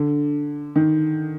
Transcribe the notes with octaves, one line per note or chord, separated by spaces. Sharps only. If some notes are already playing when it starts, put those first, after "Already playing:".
Already playing: D3
D#3